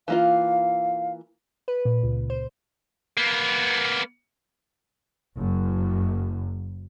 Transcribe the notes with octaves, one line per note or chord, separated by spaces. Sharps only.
E3 A#3 F4 F5
B4
A#2
C#2
C5
A#3 B3
F#1 F#2